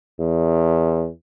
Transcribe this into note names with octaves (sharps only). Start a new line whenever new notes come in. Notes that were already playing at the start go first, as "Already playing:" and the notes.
E2